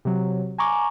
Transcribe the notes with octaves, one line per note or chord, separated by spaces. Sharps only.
C3 F#3
G#5 A#5 C#6 D6